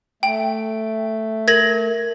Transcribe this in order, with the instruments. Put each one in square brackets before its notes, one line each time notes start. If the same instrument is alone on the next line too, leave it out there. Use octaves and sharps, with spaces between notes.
[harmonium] A3 [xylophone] G5
[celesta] A#4 F#7 [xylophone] G#6 A#6